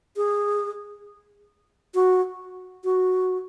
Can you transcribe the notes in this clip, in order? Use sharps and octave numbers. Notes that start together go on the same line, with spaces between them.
G#4
F#4
F#4